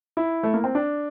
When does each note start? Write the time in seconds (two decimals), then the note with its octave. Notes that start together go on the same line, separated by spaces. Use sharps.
0.17 E4
0.43 A3
0.54 A#3
0.64 C4
0.75 D4